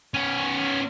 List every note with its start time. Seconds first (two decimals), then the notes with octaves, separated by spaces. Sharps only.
0.14 B3 C#4